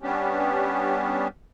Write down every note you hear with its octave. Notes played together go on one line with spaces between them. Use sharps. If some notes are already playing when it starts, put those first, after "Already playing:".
G3 B3 C#4 D4 G4